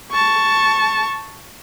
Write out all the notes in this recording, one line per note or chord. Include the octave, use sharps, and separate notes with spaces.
A5 C#6